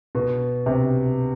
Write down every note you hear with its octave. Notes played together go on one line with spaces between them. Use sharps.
B2
C3